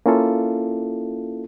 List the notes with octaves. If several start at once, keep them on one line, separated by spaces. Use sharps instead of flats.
A#3 C#4 E4 F4 A4